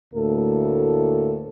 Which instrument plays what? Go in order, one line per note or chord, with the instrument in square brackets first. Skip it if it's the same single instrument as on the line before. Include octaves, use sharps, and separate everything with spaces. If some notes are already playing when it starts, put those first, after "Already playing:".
[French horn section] D2 A2 A#3 A4